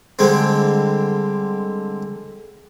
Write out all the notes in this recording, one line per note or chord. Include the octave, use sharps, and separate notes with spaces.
D3 G3 G#3 C4